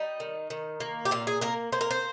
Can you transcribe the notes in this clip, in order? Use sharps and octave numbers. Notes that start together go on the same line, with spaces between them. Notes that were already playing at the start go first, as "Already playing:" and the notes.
Already playing: G3 D#4
D#3
D#3
A#3
G4
A#2 F4
G#4
A#3 A#4
A#3 C5
A#4
C5